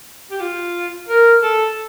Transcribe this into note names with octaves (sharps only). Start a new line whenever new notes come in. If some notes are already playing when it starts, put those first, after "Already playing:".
G4
F4
A#4
A4